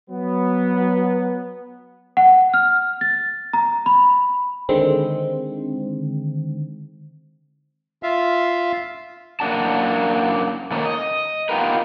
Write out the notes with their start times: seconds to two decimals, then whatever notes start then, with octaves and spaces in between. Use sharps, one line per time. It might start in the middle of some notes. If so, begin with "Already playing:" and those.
0.10 F#3 B3
2.17 F#5
2.54 F6
3.01 A6
3.53 A#5
3.86 B5
4.69 D3 D#3 G#3 C4
8.03 F4 E5 F5
9.40 F#2 C3 A#3 D4 F#4 A5
10.71 D#3 A3 A#3 C#4
10.86 D#5
11.49 B3 D#4 F4 G4 A#4 B4